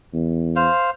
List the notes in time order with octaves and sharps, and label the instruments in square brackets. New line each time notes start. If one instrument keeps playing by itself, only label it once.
[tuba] E2
[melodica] C5 F5